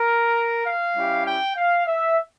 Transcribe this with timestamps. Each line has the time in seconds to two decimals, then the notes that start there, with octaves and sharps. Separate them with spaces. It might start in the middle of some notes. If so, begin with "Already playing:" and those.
Already playing: A#4
0.65 F5
0.95 G3 C#4 E4 G4
1.26 G5
1.56 F5
1.86 E5